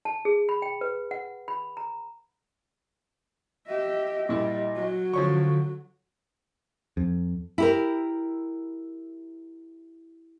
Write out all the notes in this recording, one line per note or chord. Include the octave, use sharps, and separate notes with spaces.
A5
G#4
B5
G5
B4
F#5
B5
A#5
G4 D#5 E5
A#2 G3 E4
F#3 F#4
D3 F3 C#4 C#6
F2
E4 G4 A#4